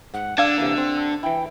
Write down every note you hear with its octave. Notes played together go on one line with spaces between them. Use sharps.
G#2 F#5
D3 D4 F5 E6 G#6
C3 E3 A#3
C4
E3 E4 G5